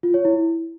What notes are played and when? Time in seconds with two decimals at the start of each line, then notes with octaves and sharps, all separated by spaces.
0.03 F4
0.14 C#5
0.25 E4